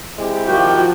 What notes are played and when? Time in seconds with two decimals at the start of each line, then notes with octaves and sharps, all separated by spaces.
0.18 G#3 C4 E4 G4
0.48 D#3 F3 F#4 G5